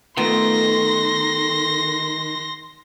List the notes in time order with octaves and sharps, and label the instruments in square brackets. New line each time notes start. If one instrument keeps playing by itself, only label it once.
[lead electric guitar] D#3 [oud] A3 B3 F4 [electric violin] C6 A#6